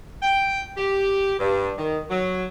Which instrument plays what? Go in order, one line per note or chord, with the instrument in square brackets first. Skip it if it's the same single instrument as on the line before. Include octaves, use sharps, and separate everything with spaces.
[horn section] G5
G4
G2
D#3
F#3